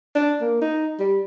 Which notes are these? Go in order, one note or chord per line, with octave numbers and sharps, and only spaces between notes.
D4
A#3
D#4
G3